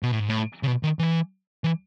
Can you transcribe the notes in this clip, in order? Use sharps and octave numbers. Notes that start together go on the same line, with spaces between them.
B2
A2
G#2
A2
C#3
B2
D#3
E3
E3